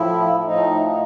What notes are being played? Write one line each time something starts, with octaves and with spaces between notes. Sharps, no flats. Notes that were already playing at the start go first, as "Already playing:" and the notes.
Already playing: A2 F3 E4
A2 F3 D#4
D#4